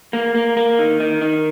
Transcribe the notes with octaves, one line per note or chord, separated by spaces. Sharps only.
A#3
A#3
A#3
D#3
D#3
D#3